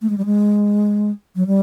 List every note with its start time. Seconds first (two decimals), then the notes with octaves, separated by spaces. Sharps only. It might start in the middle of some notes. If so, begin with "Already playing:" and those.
0.02 A3
0.10 G#3
0.18 G3
0.25 G#3
1.36 F#3
1.47 G3